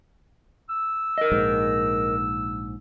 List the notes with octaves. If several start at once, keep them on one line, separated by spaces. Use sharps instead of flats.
E6
A#4 D#5
A#1 G#2